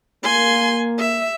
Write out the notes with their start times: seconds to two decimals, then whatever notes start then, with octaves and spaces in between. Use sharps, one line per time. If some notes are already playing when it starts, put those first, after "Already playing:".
0.24 A#3 G#5 C6
0.99 E5